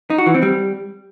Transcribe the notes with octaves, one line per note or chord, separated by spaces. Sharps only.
D#4
F#4
E3
C4
G3